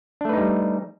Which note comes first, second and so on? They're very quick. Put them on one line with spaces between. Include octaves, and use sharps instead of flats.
D4 A3 B4 D#4 G3